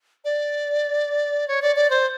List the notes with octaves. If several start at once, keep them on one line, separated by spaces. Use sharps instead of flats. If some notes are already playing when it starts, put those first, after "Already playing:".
D5
C#5
D5
D5
C5